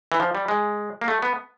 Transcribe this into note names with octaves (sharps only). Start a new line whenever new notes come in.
E3
F3
G3
G#3
A#3
A3
B3